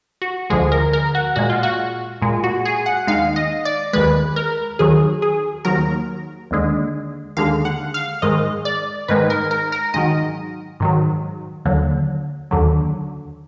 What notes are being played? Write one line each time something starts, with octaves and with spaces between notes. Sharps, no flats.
F#4
D2 D3 F3 G#3 G#4
A#4
A#4
F#4
A#2 G#3 F#4
F4
F#4
A#2 G#3
F#4
G#4
F#5
D#2 D#3 G#3 F5
D#5
D5
D#2 D#3 G#3 B4
A#4
D#2 D#3 F#3 G#4
G#4
D#2 D#3 F#3 A#4
D#2 D3 G#3
D#2 D3 G#3 F5
F#5
F5
G#2 D#3 G#3 D#5
D5
G#2 D#3 G#3 B4
A#4
A#4
A#4
G#2 D#3 F#3 D#5
G#2 D#3 F#3
D#2 D3 F#3
D#2 D3 F#3